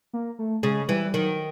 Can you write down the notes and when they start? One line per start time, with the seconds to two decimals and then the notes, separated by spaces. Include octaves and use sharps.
0.13 A#3
0.39 A3
0.63 C#3 G#3
0.88 E3 G3
1.05 G3
1.13 D#3 F#3